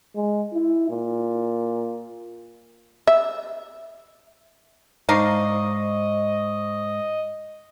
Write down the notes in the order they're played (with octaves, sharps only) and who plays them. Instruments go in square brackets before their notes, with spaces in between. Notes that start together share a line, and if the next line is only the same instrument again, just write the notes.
[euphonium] G#3
E4
A#2
[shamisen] E5
[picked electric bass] G#2 [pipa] D4 D#4 F5 [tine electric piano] C5 C#6 A#6 [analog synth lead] D#5